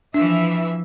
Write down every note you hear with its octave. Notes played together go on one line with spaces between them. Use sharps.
E3 F3 D4 E5